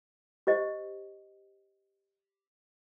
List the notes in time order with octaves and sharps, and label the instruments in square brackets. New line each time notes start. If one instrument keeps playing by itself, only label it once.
[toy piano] G4 C5 D#5